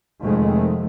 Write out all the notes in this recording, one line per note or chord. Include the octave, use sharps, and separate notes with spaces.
F1 F2 D#3 G#3 A3